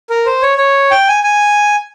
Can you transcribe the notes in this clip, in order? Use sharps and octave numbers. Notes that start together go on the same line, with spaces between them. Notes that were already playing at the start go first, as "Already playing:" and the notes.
A#4
C5
C#5
C#5
G5
G#5
G#5